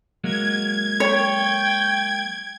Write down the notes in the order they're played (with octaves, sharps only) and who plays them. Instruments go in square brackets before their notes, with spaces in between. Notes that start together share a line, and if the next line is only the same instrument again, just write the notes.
[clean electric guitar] F#3 G#3 A#3 [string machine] G#6
[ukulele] C#5 [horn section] G5